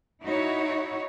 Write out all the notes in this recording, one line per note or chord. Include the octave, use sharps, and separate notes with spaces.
D#4 E4 F#4 C#5 E5